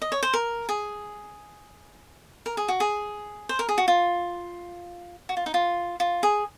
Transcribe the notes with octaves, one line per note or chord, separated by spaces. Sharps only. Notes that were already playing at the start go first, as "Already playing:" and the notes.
D#5
C#5
C5
A#4
G#4
A#4
G#4
F#4
G#4
C5
A#4
G#4
F#4
F4
F#4
F4
D#4
F4
F4
G#4